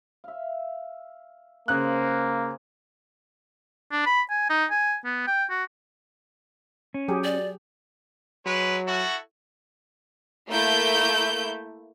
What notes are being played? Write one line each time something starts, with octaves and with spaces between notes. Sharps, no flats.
E5 F5
C#3 A#3 G#4 C5 C#5 F#6
D4
B5
G#5
D#4
G#5
B3
G5
F#4
C#4
F#3 G4 G#4
D5
F#3 G#3 B4 C#5
E4 F#4 A4
A3 A#3 E4 G6